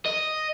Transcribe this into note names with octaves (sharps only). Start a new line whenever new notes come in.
D#5